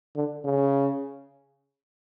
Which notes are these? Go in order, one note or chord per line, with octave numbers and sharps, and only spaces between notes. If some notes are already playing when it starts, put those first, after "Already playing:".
D3
C#3